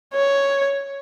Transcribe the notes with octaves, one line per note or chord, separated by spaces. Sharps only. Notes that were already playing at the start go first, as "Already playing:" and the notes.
C#5